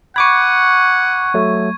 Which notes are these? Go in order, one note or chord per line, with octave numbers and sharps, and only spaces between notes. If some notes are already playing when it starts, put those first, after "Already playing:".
F#5 B5 C#6 D6 G#6 C#7
F#3 A3